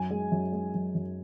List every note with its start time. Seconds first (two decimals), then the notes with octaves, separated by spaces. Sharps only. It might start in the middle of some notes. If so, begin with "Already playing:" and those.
Already playing: F#2 G#5
0.11 G#3
0.32 F#2
0.52 G#3
0.75 F#2
0.95 F#2